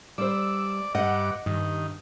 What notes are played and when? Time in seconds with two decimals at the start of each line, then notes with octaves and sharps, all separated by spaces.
0.18 G3 C5 D5 E6
0.95 G2 D#5 F#5 D6
1.46 G2 D#3